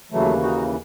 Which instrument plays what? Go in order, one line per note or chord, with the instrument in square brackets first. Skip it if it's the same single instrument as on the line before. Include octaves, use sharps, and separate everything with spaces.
[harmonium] D#2 C#3 E3 F#3 A3
D#4 F#4